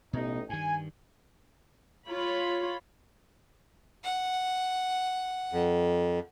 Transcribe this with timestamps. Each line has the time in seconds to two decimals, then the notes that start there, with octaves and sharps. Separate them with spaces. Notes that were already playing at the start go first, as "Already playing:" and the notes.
0.13 A1 B2 B3 D#4
0.49 G2 D#3 G#5
2.07 F4 C#5 B5
4.04 F#5
5.52 F2